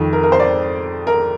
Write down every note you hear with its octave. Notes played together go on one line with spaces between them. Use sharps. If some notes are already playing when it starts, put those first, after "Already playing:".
Already playing: F2 D#3
A#4
A#4
C5
D5
A#4